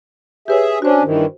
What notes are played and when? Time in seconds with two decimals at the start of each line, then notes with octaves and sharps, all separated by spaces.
0.48 G4 G#4 B4 C#5 E5
0.82 C#4 D4 F#4 C5
1.03 G2 D#3 E3